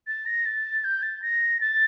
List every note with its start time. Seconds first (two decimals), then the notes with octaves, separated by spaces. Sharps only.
0.07 A6
0.26 A#6
0.46 A6
0.84 G6
1.02 A6
1.22 A#6
1.61 A6